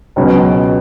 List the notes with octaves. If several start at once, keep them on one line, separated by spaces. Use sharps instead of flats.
C#2 B2 F#3 C#4